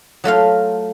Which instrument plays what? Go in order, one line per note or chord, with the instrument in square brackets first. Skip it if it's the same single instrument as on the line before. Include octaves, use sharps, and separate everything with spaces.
[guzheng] F#3 A3 F4 F5